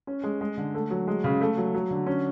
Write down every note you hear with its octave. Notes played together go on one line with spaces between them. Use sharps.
C#4
G#3
G#3
D3
A3
F#3
G#3
C#3
A3
F#3
F#3
D3
C#4